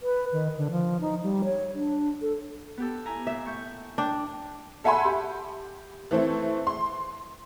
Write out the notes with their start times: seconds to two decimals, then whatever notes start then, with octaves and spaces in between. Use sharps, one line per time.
0.01 B4
0.33 D#3
0.58 D3
0.71 F3
1.01 D#4
1.23 G3
1.44 C#5
1.74 D4
2.22 A4
2.77 B3 G4 A4
3.06 E4 G#5 A#5
3.27 A#2 E5
3.45 A2 C#6 G6
3.98 D4 G5
4.84 A4 E5 F#5 G#5 B5 C6
5.05 G4
6.11 E3 A3 C4
6.67 C6